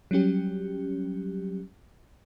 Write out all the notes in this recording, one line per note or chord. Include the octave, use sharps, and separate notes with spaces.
F#3 G3 C#4 G4